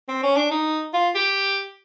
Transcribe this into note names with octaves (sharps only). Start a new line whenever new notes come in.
C4
C#4
D4
D#4
F4
G4